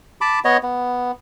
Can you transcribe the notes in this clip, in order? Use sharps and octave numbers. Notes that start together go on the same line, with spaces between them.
A5 B5 D6
B3 C#5 D#5
B3